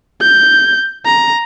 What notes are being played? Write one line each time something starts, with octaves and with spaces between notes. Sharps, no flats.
G6
A#5